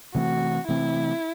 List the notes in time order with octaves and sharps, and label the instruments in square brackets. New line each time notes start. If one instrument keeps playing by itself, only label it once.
[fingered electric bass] C3 E3 A3 C4 [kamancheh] F#4
[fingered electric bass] C3 E3 A3 C4 [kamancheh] E4